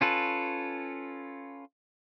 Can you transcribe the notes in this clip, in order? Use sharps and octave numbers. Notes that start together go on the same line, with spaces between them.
C#4 F4 A4 B4